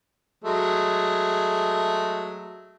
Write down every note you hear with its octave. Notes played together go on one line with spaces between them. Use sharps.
F#3 G#3 A3